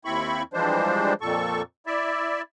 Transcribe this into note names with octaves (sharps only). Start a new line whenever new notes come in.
D#2 C4 E4 B5 C#6
E3 F3 G3 G#3 D4 C5
F2 A#2 A4 C#6
E4 D5 E5